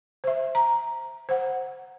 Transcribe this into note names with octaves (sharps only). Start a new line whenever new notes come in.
C5 E5
A#5
C5 F#5